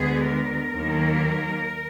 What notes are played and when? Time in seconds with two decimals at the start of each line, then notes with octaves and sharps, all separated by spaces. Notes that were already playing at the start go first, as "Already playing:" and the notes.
Already playing: D2 D3 G#3 B3 G#4
0.25 A#4
0.73 D#2 D#3 F#3 A#3